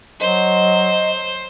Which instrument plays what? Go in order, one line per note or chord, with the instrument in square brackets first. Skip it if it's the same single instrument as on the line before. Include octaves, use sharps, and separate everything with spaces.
[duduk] F#3 [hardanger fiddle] C5 [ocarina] D#5